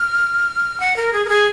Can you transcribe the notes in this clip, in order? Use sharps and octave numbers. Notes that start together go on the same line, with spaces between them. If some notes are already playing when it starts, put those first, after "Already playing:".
Already playing: F6
F#5
A#4
G#4
A#4
G#4